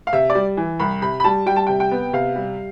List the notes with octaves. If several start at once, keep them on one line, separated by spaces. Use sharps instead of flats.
F5
C3 E5
D5
G3
E3
C2 B5
C3 B5
B5
G3 A5
G3 G5
A5
C3 G5
G5
B3
C3 F5
G3